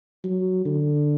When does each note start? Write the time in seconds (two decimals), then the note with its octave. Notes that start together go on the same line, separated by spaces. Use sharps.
0.24 F#3
0.65 D3